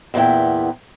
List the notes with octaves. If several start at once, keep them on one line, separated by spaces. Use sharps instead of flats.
E2 A#2 B3 E4 G5